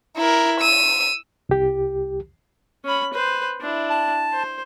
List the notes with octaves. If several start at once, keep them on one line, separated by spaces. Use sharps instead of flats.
E4 A#4
E6 D#7
C2 G4
C#4 B5
B4 C5
D4 E4
A5
C5